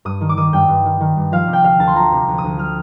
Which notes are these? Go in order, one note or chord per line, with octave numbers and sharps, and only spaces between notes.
G2 D#6
D#3
D6
D#3 D#6
G2 G5
G2
D#3
D#3
G2
F3 F5
C3
G5
D2 F5
D2 A5
C6
F3 A#5
C3
D2
D#6
D2
F3 F6